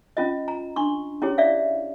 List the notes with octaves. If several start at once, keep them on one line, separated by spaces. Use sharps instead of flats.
C#4 F4 D#5
A#5
D4 C6 C#6
C#4 E4 G4 G#4 C#5
D5 E5 F5